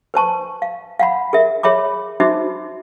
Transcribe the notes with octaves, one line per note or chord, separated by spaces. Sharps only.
B4 C5 A5 C#6
F5
F5 F#5 B5
G#4 A#4 E5
G#4 C#5 E5 B5 D6
D#4 F#4 C5 E5 B5 D6